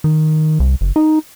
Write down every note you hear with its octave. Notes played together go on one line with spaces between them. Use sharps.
D#3
C2
F#1
D#4